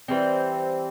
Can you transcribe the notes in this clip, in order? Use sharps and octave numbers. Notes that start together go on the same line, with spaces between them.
E3 G3 C4